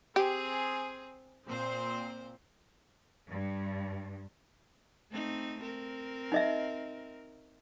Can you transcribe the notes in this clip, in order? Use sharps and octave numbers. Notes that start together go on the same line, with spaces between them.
C4 G4 G#4
A#2 C4 C5
G2
A3 C4 D#4
C4 A#4
D#4 D#5 E5